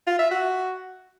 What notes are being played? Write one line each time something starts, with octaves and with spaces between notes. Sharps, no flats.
F4
E5
F#4